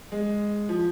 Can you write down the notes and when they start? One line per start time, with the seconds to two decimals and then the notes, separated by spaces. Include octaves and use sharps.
0.12 G#3
0.69 F3